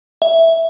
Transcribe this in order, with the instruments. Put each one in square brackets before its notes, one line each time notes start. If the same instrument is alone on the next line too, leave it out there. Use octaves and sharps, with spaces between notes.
[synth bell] E5